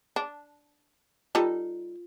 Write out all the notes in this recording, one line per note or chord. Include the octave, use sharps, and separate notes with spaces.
D4
G3 D#4 F4 A4